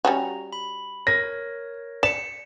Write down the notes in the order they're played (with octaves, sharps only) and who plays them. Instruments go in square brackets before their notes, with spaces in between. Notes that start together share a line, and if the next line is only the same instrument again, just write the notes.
[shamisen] G3 C#4 F#4 [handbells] A#5
[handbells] B5
[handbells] A#4 C#5 [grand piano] A#6
[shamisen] D5 [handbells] B6 C#7 [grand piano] E7